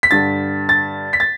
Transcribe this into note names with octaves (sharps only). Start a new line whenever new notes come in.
B6
G2 D3 A6
A6
B6
A6